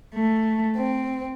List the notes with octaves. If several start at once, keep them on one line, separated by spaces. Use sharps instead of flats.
A3
C4